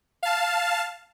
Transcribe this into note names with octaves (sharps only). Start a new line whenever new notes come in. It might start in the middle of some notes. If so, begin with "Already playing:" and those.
F5 A5